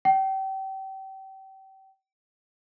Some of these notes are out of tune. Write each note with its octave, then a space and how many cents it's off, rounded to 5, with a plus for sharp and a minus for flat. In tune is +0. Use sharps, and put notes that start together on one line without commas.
G5 -30